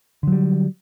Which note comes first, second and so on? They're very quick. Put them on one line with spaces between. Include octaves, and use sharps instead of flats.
D3 F#3 G3